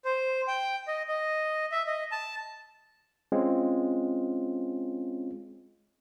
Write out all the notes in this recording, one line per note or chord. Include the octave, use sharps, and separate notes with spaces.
C5
G5
D#5
D#5
E5
D#5
A5
G#3 C4 C#4 F4